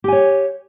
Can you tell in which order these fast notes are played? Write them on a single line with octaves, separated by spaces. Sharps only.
G4 G#5 C#5